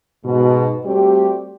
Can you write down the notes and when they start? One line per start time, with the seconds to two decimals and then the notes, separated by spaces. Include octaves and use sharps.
0.25 G#2 B2
0.84 G3 A3 C4 F#4 G4